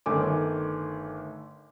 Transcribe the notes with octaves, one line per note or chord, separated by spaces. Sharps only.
G1 D#3 A3 G#5 D6